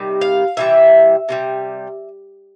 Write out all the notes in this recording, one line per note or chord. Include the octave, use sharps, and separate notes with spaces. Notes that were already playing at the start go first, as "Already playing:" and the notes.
Already playing: C3 D#3 G3
F5
C3 E3 G3 E5
C3 E3 G3